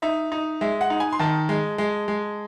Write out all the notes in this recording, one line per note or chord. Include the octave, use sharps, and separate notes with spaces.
D#4 E5
D#4
G#3 E5
F#5
D#4
G#5
C6
D#3 A5
G#3
G#3
G#3